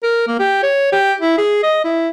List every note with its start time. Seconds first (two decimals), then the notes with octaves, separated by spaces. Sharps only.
0.03 A#4
0.27 A#3
0.39 G4
0.63 C#5
0.92 G4
1.21 E4
1.38 G#4
1.63 D#5
1.84 E4